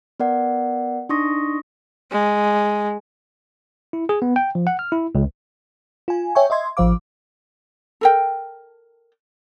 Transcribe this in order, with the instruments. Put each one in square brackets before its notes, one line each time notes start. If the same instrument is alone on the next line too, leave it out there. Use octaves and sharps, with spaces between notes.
[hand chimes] B3 A#4 D5 F#5
D4 D#4 C6 C#6 D#6 A#6
[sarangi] G#3
[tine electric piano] E4
G#4
B3
G5
F3
F#5
F6
E4
C#2
[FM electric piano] F4 G#5
C#5 E5 G5 G#5 C#6
D#5 E5 C6 G#6
A1 F3 C5 F5 D6
[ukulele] A4 A#4 G5